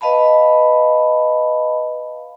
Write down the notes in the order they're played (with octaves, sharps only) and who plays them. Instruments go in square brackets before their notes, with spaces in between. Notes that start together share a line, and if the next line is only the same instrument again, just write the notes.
[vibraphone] B4 D#5 F5 A5 B5